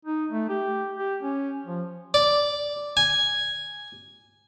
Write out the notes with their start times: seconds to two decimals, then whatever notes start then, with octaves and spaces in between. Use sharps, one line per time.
0.05 D#4
0.30 A3
0.49 G4
0.96 G4
1.22 C#4
1.66 F3
2.14 D5
2.97 G#5